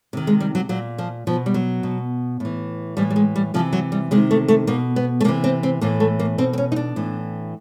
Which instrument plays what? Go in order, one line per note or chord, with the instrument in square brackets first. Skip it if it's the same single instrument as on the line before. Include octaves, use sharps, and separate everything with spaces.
[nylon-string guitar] C3 D#3
G#3
G3
F#3
A#2 F#3
F3
B2 F3
G3
F#3
B2
A2 E3
A2 E3 G3
G3
G#3
G3
C3 E3 F3
F#3
G3
C3 D#3 G#3
A3
A3
B2 A#3
B3
A3
C3 A#3
E3
C4
C4
A2 E3 A#3
A3
A#3
B2 C4
C4
C#4
D#4
D4
A2 E3